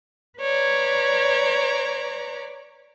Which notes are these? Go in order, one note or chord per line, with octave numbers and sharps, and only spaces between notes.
B4 C#5 D5 A#5